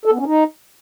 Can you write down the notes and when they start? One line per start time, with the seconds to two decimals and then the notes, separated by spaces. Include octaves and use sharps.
0.05 A4
0.12 B3
0.19 C#4
0.26 D#4